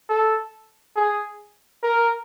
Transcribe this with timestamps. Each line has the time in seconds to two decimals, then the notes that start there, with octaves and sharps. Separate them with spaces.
0.09 A4
0.96 G#4
1.83 A#4